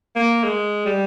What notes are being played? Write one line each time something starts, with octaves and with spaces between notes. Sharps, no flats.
A#3
G#3
G3